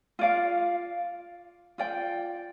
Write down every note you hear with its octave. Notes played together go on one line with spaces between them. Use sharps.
F4 D5 F5
F4 D5 G5